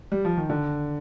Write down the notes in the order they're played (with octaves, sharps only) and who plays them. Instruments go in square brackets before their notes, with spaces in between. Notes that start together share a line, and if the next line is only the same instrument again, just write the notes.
[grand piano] G3
F3
D#3
D3